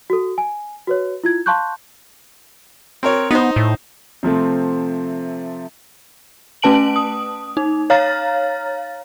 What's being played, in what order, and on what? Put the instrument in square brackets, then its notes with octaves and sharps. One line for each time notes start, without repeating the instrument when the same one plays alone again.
[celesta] F#4 A4
G#5
F#4 B4 C#5
E4 F4 G#6
F5 A5 C6 C#6 F#6 G6
[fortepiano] C4 A#4 C#5
[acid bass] B3 [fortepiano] D#4 C5
[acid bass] A2
[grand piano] C3 F3 A3 C4
[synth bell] A3 C#4 B4 A5 D7 F#7
D#6
D#4
C#5 F5 A#5 F6 A6